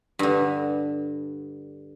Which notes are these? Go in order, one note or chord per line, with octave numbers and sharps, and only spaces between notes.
G2 D3